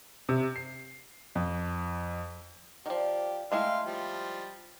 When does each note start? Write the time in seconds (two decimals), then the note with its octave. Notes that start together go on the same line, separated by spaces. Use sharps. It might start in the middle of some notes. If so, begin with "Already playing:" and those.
0.29 C3
0.56 C7
1.35 F2
2.86 D#3 F3 D4 G4 A#4
3.52 G#3 A3 E4 F5 G5 C6
3.86 F3 G3